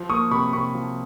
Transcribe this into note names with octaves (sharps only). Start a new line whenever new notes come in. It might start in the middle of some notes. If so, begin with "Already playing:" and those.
Already playing: F3
A#3 C#6 D#6
C3 B5 C#6
C3 B5 C#6
F3